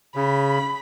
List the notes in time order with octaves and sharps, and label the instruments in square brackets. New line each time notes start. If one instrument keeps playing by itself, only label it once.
[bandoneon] C#3 [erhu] B5